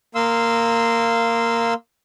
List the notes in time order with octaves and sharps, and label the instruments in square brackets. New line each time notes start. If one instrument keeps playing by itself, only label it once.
[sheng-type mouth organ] A#3 F5 C6 E6